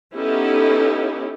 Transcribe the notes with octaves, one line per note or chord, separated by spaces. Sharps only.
B3 C#4 D#4 E4 G4 A4